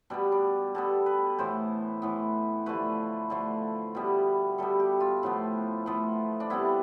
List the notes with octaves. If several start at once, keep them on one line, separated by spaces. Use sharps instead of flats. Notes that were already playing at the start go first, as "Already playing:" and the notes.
B2 G3 B3 D4
D4
B2 G3 B3 A4
B4
A2 E3 B3 C5
A2 E3 B3
D3 F3 A3 B4
D3 F3 A3
B2 G3 B3
B2 G3 B3 A4
G4
F4
A2 F3 B3
A2 F3 B3
D4
C3 G3 B3 E4